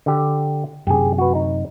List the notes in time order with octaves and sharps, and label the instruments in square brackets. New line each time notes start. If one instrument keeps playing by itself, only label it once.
[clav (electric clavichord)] D3 G4
[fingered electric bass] F#2 C3 [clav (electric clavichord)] G4 G#4
[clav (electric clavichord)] F#4 B4
D#4